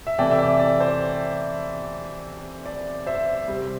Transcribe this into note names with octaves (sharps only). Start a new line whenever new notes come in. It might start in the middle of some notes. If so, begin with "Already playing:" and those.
E5
C3 E3 A3 D5 G5
E5
D5
D5
C5
D5
C5 E5
C3 G3 C4